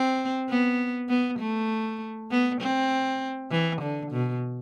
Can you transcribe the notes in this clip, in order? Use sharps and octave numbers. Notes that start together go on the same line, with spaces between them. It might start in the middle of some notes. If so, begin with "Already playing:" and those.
Already playing: C4
B3
B3
A3
B3
C4
E3
D3
B2